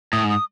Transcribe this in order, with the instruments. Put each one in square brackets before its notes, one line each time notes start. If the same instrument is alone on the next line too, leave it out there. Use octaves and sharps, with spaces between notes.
[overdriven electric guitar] A2 [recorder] D#6
[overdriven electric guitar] G#2
[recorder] D#6